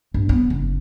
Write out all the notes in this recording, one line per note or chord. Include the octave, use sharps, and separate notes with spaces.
G2
B3
F#1